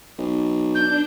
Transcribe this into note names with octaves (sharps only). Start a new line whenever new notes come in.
B1
D4 G6